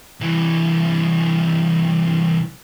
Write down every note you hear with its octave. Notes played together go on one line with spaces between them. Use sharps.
C2 E3